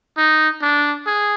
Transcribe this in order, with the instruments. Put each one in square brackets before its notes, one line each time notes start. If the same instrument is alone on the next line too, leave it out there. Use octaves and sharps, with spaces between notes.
[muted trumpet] D#4
D4
G#4